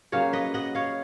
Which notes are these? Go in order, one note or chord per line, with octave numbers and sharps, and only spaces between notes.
C#3 F#3 A#3 C#4 C#5 F5
B4 D#5
D#5 F#5
C#5 F5